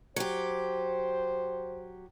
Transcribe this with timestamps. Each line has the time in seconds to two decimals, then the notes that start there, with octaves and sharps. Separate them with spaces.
0.16 F#3 G4 C5